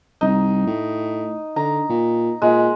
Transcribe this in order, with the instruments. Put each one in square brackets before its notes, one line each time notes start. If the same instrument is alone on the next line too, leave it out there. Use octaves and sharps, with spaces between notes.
[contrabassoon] C2 [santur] D#4
[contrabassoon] A2
[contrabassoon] D3 [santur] A#5
[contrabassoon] A#2
[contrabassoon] A#2 [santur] G#3